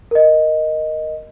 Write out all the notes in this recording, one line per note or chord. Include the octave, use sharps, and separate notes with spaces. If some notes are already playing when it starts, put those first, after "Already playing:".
A#4 D#5